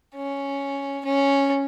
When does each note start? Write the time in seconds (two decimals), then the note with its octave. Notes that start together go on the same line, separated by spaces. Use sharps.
0.15 C#4
1.05 C#4